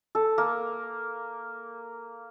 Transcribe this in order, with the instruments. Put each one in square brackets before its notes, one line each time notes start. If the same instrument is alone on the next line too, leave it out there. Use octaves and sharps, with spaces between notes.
[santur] A4
A#3